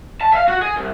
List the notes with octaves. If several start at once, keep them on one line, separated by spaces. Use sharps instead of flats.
A5
E5 F5
F#4
G#4
C2